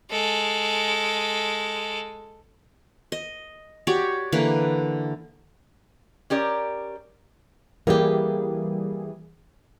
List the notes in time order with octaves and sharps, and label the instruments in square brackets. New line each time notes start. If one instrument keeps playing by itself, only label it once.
[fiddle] G#3 A4
[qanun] D#5
F#4 G4 C#5 D5
D3 E3 A#3 B4
[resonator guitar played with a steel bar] C#4 G4 A#4 D5
[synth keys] E3 G3 G#4 [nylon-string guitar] A#3 G4